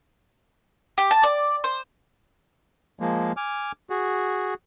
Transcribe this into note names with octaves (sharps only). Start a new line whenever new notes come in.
G4
A5
D5
C5
F3 G#3 A#3
G#5 D6 F6
F#4 G#4